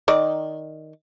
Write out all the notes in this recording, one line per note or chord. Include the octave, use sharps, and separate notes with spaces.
D#3 D5